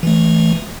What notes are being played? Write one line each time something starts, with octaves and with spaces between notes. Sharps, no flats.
E3 A3